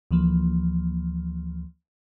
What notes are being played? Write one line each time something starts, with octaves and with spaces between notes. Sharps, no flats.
D2 E3 F3 A#3